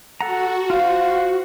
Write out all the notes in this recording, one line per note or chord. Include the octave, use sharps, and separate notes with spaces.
F#4 A4 F#5 A#5
F4 C5 F5